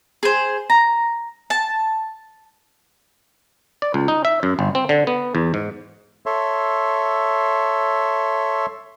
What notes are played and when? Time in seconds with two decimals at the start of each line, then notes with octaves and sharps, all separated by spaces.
0.23 G#4 C5
0.70 A#5
1.50 A5
3.82 D5
3.94 C#2
4.08 D#4
4.25 E5
4.43 F#2
4.59 G1
4.75 C4
4.89 D3
5.07 B3
5.35 E2
5.54 G#2
6.26 A4 C#5 E5 C6